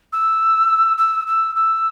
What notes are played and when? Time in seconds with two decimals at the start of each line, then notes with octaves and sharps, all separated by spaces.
0.12 E6
0.98 E6
1.27 E6
1.55 E6